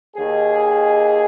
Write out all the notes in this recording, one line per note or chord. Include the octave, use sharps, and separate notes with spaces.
D#2 D#3 G#4